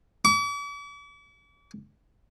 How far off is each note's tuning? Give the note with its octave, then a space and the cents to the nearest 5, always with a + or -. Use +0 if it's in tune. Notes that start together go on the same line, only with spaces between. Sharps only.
D6 -45